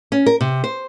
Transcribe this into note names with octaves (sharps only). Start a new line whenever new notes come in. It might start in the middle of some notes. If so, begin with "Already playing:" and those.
C#4
A#4
C3
C5